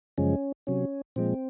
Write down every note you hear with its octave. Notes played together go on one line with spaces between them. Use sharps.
F#2 C#3 F3 G#3 C#4
C3 F#3 C#4
A#2 F3 G#3 C4